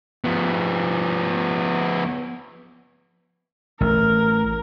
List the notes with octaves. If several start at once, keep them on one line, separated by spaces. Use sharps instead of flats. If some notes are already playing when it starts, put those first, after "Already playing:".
F3 B3
A1 A#4